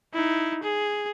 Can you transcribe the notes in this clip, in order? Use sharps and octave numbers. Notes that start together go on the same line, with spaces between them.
D#4 E4
G#4